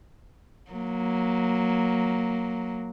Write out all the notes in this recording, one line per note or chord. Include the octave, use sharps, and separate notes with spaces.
F#3 A#3